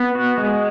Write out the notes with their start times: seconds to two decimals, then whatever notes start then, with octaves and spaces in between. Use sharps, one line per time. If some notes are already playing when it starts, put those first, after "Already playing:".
Already playing: B3
0.15 F#4
0.38 G#3